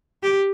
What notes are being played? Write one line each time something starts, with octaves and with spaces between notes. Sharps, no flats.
G4